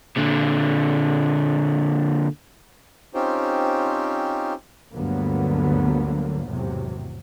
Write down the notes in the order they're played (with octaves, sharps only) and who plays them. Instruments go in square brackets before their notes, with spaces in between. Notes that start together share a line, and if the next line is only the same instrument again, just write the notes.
[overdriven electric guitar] A#2 D3
[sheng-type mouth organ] C4 C#4 D#4 F4 G4 C5
[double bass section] D2 G2 D3 F#3 A#3 B3
G#1 E2 A2 C3 F#3